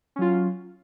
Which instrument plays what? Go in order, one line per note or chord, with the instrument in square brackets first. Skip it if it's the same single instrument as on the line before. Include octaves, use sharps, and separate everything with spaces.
[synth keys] C#4
F#3
F4